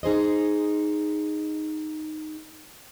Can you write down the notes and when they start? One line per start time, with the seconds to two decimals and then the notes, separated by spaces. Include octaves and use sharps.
0.03 D#4 G#4 C5 D#5